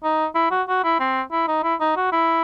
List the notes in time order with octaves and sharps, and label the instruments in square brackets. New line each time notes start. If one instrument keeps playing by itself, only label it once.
[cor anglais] D#4
E4
F#4
F#4
E4
C4
E4
D#4
E4
D#4
F#4
E4